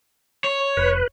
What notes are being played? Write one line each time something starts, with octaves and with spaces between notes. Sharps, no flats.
C#5
F1 B4